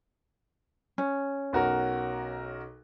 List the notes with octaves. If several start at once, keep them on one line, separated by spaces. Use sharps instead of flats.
C#4
B1 F#4 A#4